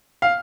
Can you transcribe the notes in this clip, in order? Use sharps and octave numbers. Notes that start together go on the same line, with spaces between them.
F5